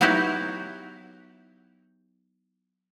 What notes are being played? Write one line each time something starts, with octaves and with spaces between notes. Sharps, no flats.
F#3 B3 D#4 E4 F#4 G4